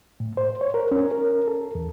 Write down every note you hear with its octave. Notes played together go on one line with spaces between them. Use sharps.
A2
C5
C#5
A#4
C#4
A#4
A4
E2